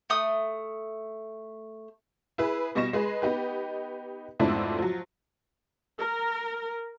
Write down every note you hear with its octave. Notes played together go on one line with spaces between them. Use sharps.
A3 D#6
E4 G#4 B4
B2 G3 D#5 C#6 A#6 E7
G#3 G#4 B4
B3 D#4 G4 B4
F2 G#2 B2 A3 D4 E4
F3 F#3
A#4